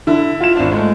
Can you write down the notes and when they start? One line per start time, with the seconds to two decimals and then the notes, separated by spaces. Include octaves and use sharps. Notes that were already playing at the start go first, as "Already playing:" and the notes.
0.07 D3 E4
0.40 F4 E7
0.56 G#1 D4
0.71 G#3 A3